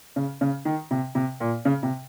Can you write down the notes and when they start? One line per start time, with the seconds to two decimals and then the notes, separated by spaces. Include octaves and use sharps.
0.16 C#3
0.41 C#3
0.65 D#3
0.91 C3
1.15 C3
1.40 A#2
1.65 C#3
1.83 C3